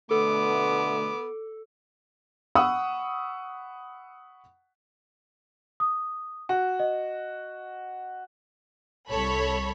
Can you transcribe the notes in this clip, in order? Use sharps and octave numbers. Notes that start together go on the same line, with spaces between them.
B2 D3 A3 B3 A4 D6
F#5 B5 C#6 D#6 E6
D#6
F#4
D#5
C2 A4 C#5 B5